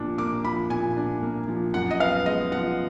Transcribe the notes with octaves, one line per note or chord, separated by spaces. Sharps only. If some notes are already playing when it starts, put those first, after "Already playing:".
Already playing: A#2 F3 A#3 D4
A#3 D6
F3 B5
A#2 G#5
D4
A#3
F3
F#2 F#5
D#5
B3 F5
G#3 D#5
F3 F#5